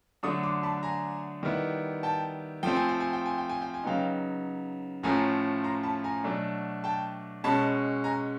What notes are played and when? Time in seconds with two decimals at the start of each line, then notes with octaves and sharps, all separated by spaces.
0.23 D3 F#3 A3 D4 C#6 D#6
0.43 C6 D6
0.63 A5 B5
0.83 G#5 A#5
1.43 D#3 G3 B3 E4
2.03 G5 A5
2.63 F3 A3 C4 G5
2.76 G#5
2.89 G5
3.00 G#5
3.13 G5
3.26 G#5
3.38 G5
3.49 G#5
3.62 G5
3.74 G#5
3.84 C#3 F#3 B3 D#4 F5 G5
5.03 A2 F3 A3 C#4 G#5 A#5
5.64 A#5 C6
5.83 A5 B5
6.04 G#5 A#5
6.23 B2 F#3 A3 D4
6.84 G5 A5
7.44 B2 G#3 C#4 A5 B5
8.04 G#5 A#5